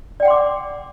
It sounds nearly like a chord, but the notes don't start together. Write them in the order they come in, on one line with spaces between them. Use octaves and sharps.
D5 G5 F#5 C6 D6